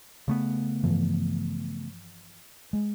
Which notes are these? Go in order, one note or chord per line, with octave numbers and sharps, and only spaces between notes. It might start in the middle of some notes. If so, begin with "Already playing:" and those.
C#3 A3 B3
G2 E3 F3
G#3